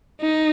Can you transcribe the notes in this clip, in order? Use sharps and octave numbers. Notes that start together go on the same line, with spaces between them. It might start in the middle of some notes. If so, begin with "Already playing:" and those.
D#4